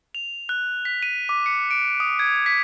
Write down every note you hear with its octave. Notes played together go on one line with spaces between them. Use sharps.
F7
F#6
B6
D#7
D6
C#7
D7
D#6
G#6
B6